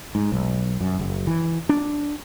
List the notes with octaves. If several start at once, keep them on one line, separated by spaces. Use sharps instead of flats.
G#2
B1
F#2
F#1
E3
D4